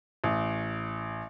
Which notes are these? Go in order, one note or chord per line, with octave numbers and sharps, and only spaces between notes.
A1